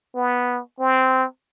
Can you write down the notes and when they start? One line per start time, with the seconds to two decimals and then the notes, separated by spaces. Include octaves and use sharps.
0.16 B3
0.80 C4